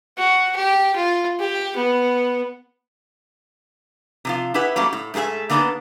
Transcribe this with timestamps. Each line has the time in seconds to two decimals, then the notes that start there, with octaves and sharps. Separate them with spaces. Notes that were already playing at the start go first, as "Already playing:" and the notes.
0.18 F#4
0.56 G4
0.96 F4
1.39 G4
1.77 B3
4.25 C3 F3 F4
4.54 E4 G4 G#4 B4 E5 F#5
4.76 F#3 G3 A3 A#3 C#4
4.93 A2
5.14 G#2 A3 B3 G#4 E5
5.49 D3 A#3 B3 D4 D#4 G#4